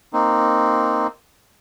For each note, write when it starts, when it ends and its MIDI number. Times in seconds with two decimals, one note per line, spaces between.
0.13 1.07 58
0.13 1.07 60
0.13 1.07 63